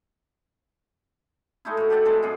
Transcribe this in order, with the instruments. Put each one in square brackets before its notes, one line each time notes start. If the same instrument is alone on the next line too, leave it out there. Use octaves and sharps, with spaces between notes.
[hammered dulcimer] G#3 A3 D#4 E4
A2 F#4
G4 A4 D5 F#5
C3 G#3 A4
F#2 B2 G#4